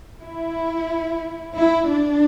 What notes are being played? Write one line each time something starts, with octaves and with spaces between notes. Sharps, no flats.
E4
E4
D4